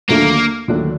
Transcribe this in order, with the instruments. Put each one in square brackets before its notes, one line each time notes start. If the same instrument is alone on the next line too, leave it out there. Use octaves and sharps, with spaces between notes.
[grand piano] D#2 D3 F#3 A3 D4 [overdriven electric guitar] A#3
[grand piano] D#2 D3 F#3 A3 D4